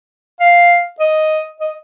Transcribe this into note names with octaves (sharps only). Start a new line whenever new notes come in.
F5
D#5
D#5